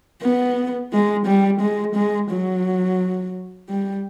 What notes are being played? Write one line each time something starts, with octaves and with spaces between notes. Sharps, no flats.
B3
G#3
G3
G#3
G#3
F#3
G3